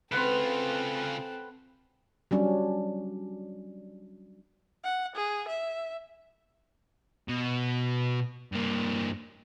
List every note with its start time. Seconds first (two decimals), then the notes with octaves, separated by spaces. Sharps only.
0.12 C#3 C4 F4 A4 B4 F#5 C6
2.31 F#3 G3 C#4 D4
4.84 F#5
5.16 G#4
5.48 E5
7.28 B2
8.52 G2 A#3